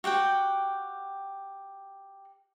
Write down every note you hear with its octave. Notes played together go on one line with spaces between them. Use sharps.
F#4 G4 F#5 G5